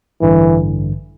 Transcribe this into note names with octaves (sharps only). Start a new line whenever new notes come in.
A1 G2 D3 E3